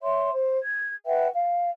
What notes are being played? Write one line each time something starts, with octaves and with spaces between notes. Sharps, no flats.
C#5 E5 C6
C5
G#6
B4 E5 F#5 G5
F5